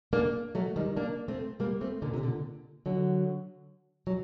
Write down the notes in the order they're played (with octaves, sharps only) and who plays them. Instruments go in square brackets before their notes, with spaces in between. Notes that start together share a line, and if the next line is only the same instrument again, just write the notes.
[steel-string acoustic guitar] A#3 D4
F#3 A3
D#3 G3
A#3 D4
A3 C4
G3 A#3
A3 C4
A#2 D3
C3
A#2 D3
D3 F#3
F#3